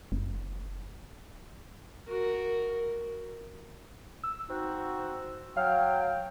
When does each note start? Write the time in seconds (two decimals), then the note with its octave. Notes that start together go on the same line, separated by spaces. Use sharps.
0.12 F#1
2.07 F#4 A#4
4.24 E6
4.49 C4 D#4 F#4
5.57 F#3 F5 G5 F6